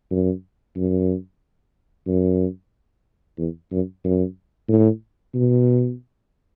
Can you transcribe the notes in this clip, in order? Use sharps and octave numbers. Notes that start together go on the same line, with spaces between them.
F#2
F#2
F#2
E2
F#2
F#2
A2
B2